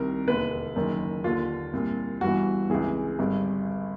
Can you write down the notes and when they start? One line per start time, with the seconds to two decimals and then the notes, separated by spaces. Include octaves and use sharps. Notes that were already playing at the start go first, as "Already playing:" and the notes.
Already playing: C2 C3 D#3 A#4
0.27 E1 D#2 D3 B4
0.76 F#1 F#2 D#3
1.24 D#2 D3 F4
1.73 C2 A#2
2.21 G1 G2 E3 F#4
2.70 C#2 C3 E3 G#4
3.19 G#1 G2 D3